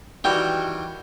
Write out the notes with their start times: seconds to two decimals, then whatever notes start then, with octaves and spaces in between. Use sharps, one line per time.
0.24 D#3 E3 G3 F#4 G5